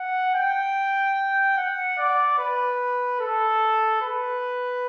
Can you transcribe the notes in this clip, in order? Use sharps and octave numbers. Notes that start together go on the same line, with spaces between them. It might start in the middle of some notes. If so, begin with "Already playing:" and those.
Already playing: F#5
G5
F#5
D5
B4
A4
B4